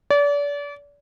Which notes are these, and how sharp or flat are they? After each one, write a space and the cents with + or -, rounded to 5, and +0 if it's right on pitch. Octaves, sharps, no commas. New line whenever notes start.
D5 -35